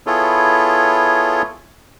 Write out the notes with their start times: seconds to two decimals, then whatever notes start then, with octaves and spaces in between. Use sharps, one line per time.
0.07 B3 E4 F4 G#4 A4 C#5